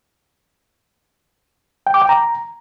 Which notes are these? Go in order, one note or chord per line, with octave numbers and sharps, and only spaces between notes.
G5
D6
G5
A#5